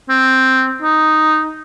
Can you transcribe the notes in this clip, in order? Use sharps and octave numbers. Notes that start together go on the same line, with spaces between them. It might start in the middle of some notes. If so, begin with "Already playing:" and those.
C4
D#4